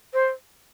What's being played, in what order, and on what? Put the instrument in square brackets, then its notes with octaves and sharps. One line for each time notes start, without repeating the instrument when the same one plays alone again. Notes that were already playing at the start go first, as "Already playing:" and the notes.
[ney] C5